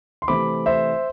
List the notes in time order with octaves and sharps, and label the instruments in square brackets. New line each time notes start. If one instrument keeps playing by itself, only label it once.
[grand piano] C6
C3 E3 A3 C4 B5 D6
C5 E5